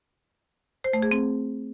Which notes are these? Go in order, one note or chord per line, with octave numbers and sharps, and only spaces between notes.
C5
A3
G#4
C4